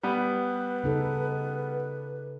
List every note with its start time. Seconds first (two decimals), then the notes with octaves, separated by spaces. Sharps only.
0.03 G3 B3 B4
0.84 C#3 D#4 A4